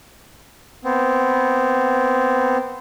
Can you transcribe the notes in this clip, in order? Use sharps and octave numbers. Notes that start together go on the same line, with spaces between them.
B3 C4